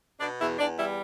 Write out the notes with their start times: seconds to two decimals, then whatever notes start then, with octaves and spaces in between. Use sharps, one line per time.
0.20 B2 D4
0.40 E2 E4
0.59 E2 D4
0.78 G3 E4